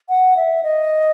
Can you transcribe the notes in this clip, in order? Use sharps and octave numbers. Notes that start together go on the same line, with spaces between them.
F#5
E5
D#5